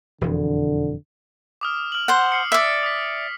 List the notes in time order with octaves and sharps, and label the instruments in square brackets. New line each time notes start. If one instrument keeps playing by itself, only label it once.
[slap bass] E1 F2 E3 [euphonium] D3
[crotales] D6 D#6 F6
F6 F#7
[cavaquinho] C5 F#5
[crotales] F6 C7 C#7
[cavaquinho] D5 E5
[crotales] D#6 B6